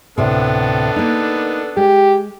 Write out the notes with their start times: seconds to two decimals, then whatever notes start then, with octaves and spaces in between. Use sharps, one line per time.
0.18 D2 A2 C3 B3 D4 A4
0.96 A#3 D#4
1.77 G#3 G4